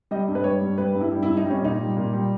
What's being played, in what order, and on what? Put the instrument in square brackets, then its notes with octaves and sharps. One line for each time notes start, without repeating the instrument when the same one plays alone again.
[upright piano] G3 D#5
G2
B4
G3 C#5
G2
G3 B4
G2
E4
G3
E4
G2
D#4
G3
C#4
A#2 D#4
G3
A#2
G3